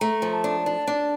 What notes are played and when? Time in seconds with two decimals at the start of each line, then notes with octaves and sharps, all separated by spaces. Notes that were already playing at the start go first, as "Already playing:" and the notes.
0.01 A3 A#5
0.22 F3
0.33 A5
0.44 D4
0.66 D4
0.87 D4